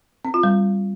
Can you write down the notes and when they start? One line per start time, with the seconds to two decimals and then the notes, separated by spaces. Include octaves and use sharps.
0.25 C4
0.34 F4
0.43 G3